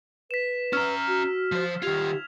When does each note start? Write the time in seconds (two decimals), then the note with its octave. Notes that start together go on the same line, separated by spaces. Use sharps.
0.31 B4 B6 E7
0.73 C#4 A#5 E6 F6 E7
1.08 F#4
1.52 F3 C5
1.82 D#3 F4 G4 G#6 F7